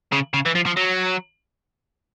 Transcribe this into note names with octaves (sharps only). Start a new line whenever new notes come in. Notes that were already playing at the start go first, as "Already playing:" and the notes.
C#3
C#3
E3
F3
F3
F#3